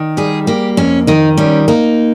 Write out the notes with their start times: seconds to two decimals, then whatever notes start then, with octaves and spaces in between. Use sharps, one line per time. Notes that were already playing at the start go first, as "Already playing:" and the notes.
Already playing: D#3
0.17 G3 G#4
0.47 A#3 G4
0.77 F2 C#4
1.07 D#3 D#4
1.37 G3 C#4
1.68 A#3 D#4